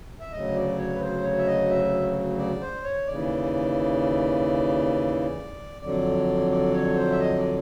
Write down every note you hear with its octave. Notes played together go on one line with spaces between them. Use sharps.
E5
D2 C#3 F#3 D#5
D5
C#5
B4
C5
C#5
E5
D#5
E5
D5
C5
C#5
D#2 C#3 E3 D5
F2 D3 F#3 D5
D5
C#5
C5
E5
D#5
D5